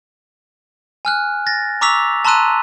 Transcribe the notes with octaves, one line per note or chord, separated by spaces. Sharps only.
G#5 F6 F#6
A6 A#6
A#5 C#6 D6 E6 B6 F7
A5 A#5 C6 E6 F#6 D#7